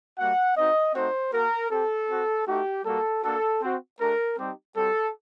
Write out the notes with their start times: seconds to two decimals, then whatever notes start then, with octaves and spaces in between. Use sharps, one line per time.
0.18 G3 A#3 F#4 F#5
0.57 C4 D#4 F#4 D#5
0.94 A3 C4 D#4 F#4 C5
1.33 A#3 F#4 A#4
1.71 C4 G4 A4
2.09 C4 F#4
2.47 A3 D#4 F#4 G4
2.85 G3 A#3 F#4 A4
3.23 A#3 D4 F#4 A4
3.63 C4 F#4
4.00 A3 D4 G4 A#4
4.38 G3 C4 D#4 G4
4.76 G3 C4 F#4 A4